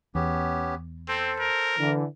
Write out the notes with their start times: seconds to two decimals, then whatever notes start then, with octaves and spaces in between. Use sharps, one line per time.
0.15 E2 B3 C#4 G4
1.08 C4 A4 C5
1.39 A#4
1.77 D3 E3